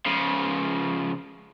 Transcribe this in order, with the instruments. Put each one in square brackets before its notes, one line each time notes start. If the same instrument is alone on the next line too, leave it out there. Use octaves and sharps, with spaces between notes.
[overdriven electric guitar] C#3 F3